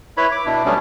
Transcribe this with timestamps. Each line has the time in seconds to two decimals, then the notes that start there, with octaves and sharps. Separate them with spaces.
0.17 E4 B4 C#5 B5
0.32 D6
0.46 B2 D4 E4
0.65 F#3 G3 A3 B3 C#4 D4